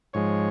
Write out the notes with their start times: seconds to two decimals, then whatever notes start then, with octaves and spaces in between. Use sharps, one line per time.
0.13 G#2 F3 G#3 C#5